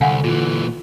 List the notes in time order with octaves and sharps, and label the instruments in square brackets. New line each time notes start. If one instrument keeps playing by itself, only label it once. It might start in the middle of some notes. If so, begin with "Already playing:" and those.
[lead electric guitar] C2 [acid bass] D3 [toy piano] F5 F#5 G#5
[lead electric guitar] A#2 E3 [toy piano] F4